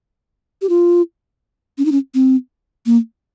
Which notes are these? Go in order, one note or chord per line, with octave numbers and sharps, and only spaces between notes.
G4
F4
C#4
D#4
C#4
C4
A#3